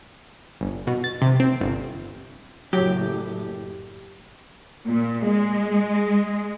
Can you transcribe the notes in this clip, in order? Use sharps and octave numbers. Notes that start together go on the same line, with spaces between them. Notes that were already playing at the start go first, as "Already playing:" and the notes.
G1
B2
A6
C3
C4
G1
F#1 A2 F#3 G4
A#2
G#3